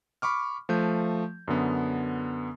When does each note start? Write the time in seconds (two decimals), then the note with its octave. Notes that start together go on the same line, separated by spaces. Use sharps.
0.22 B5 C#6 D6 F6
0.69 F3 A3 G6
1.48 F#2 D3 B3